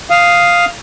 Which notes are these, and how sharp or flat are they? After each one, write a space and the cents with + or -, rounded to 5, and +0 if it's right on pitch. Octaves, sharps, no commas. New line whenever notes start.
F5 +0 D#6 +0